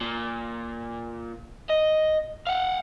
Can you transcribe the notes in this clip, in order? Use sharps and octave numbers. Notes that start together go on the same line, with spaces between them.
A#2
D#5
F5 F#5